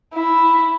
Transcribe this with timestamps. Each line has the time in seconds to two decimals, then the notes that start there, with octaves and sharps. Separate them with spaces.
0.14 E4